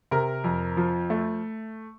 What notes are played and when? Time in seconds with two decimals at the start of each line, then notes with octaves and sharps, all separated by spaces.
0.11 C3 A#4
0.44 F2
0.77 F3
1.10 A3